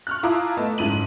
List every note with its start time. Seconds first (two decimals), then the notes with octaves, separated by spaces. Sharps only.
0.07 C#6 F6 F#6
0.23 E4 F4 A5 A#5 D6 D#6
0.57 A3 B3 D#5 A5
0.78 F#1 G#2 E4 D#7 F#7